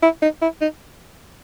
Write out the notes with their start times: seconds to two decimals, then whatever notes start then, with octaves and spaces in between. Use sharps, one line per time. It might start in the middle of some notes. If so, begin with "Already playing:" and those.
0.03 E4
0.22 D#4
0.42 E4
0.61 D#4